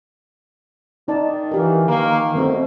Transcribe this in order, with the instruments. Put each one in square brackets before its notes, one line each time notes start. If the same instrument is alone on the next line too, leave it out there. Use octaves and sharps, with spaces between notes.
[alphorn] D#3 [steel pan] D#4 D5 A5
[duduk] E3 [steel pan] F4 G4 A#4
[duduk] D#3 [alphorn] A#3
[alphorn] B2 [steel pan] A3 C4 F#4